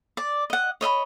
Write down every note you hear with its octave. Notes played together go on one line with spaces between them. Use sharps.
D5
D#5 F#5
C#5 D#5 E5 B5